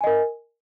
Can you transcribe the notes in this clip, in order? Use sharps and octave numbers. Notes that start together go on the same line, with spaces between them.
A#4 D#5 G#5